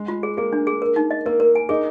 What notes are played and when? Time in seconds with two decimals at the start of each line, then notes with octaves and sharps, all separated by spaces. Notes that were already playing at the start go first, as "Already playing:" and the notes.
Already playing: G#3
0.08 F4
0.23 G#4
0.37 A#3 G#4
0.53 D4
0.67 G#4
0.82 A#4
0.96 D#4
1.11 D#5
1.26 A#3 A#4
1.40 A#4
1.55 G#5
1.69 D#4 G#4